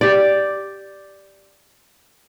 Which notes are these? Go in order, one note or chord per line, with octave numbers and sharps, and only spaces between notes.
G4 D5